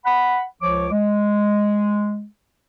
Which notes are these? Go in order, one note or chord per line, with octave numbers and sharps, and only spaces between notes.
F#5 B5
C#2 F3 C#5 D6
G#3